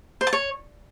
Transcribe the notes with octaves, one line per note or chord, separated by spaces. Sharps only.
C5
A5
C#5